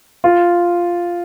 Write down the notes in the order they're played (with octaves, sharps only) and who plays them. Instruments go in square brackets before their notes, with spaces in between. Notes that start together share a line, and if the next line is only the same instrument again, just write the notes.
[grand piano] F4